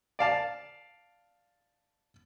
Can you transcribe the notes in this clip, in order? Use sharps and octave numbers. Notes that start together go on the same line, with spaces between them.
D5 F5 A5